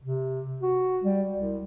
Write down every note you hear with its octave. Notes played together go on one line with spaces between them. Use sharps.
C3
F#4
G3
C2